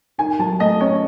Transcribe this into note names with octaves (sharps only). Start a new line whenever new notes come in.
D#3 G#5
F#3 A5
A3 D#5
C#4 C#5